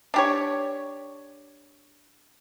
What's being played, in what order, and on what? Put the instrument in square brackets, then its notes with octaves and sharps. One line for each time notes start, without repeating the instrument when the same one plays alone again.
[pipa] D4 G4 C#5